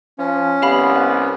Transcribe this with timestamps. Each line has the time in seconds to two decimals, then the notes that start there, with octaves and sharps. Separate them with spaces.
0.19 F3 C#4
0.62 C2 B3 G4 F5 B5